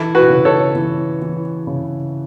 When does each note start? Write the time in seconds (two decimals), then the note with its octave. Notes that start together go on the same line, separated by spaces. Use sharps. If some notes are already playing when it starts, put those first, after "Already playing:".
Already playing: E3 E4 A4
0.15 F#4 B4
0.30 C#3
0.45 A4 C#5
0.75 E3
1.22 E3
1.67 C#3